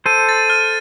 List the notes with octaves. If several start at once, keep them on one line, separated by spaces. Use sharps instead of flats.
A4 C5 D#7
A6
F6